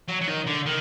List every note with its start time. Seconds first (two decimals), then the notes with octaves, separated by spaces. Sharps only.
0.08 F#3
0.21 F#3
0.27 D#3
0.46 D3
0.66 D#3